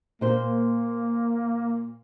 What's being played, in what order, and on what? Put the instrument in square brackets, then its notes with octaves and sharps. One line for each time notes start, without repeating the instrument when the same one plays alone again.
[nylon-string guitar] A#2 C5 [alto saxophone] A#3